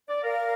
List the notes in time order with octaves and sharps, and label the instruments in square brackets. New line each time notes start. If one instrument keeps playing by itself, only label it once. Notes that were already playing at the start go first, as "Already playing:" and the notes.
[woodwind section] D5
[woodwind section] A#4 [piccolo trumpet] F5